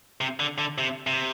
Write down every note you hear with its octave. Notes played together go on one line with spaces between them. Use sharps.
C3
D3
D3
C3
C3